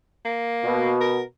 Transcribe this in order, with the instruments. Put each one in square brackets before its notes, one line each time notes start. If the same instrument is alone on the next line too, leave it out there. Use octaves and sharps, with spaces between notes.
[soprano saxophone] A#3
[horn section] B2
[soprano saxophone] A#4